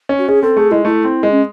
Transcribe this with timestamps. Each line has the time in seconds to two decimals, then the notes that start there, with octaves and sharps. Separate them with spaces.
0.09 C#4
0.19 F#4
0.28 C#4 G#4
0.42 C4 A4
0.57 A3 G#4
0.71 G#3 E4
0.85 A3 E4
1.04 C4
1.23 G#3
1.31 C#4